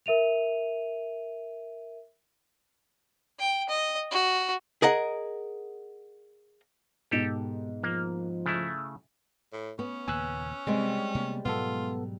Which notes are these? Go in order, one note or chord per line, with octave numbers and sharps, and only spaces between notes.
A#4 E5 D#7 F7
G5
D#5
F#4
G#4 A#4 D#5 F#5
G#2 B2 G4 A4
F3 A#3
C#3 A3 E4
A2
B3 C#4
D#2 A#2 C#3 G#5 E6 F#6
C3 G3 G#3 C4
C3 A#3 B3
G#2 B2 F#3 B3 F4 A4